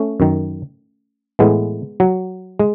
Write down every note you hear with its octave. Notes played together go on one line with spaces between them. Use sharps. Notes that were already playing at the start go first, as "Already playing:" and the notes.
Already playing: A3 C#4
F#2 D#3
A2 E3 G#3 B3
F#3
G#3